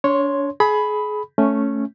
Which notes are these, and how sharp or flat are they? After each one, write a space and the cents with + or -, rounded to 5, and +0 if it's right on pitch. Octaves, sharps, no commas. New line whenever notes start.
D4 -35 C#5 +0 C6 +0
G#4 +30 B5 +0
A3 +0 C#4 +0